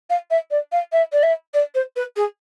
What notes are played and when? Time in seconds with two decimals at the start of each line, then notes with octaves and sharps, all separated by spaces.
0.10 F5
0.30 E5
0.51 D5
0.72 F5
0.92 E5
1.13 D5
1.23 E5
1.54 D5
1.75 C5
1.96 B4
2.16 G#4